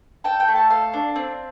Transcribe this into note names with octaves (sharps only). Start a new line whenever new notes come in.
A4 G5
G5
A3
A5
A4 F5
D4
C4